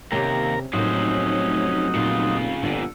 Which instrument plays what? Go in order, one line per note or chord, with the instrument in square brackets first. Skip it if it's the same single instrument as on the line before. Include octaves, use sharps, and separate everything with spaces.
[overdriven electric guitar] D#2 [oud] C3 C#4 G4 [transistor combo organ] A#4 A#5
[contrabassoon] F1 [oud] A2 A#3 [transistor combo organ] F#3 D#4 [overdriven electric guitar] C#4 C5
[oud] A#2 [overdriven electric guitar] C#3 F4
[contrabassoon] G1 [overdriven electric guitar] F2 A#2 [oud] D3